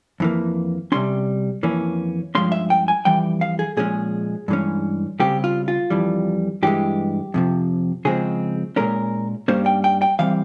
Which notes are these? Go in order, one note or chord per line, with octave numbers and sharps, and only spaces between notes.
F2 E3 A#3
C3 G3 C#4 C6
F2 E3 A#3 C#4
G2 F3 G#3 C#4 C6
E5
G5
G#5
F2 E3 G3 G5
F5
G#4
A#2 F3 G#3 C#4 G#4
G2 E3 G#3 C#4
C#3 G3 C4 G4
F4
F4
F2 E3 G3
G2 E3 G#3 G4
F2 C3 F3
C#3 F3 G#3 C4 G#4
A#2 G#3 C#4 A#4
G2 G3 A#3 C#4 C5
G5
G5
G5
E3 G3 C4 F5